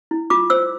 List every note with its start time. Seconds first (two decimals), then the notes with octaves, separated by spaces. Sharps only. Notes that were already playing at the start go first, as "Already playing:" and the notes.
0.11 E4
0.30 F4 D6
0.50 C5 E6